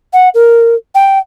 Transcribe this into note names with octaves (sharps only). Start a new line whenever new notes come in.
F#5
A#4
G5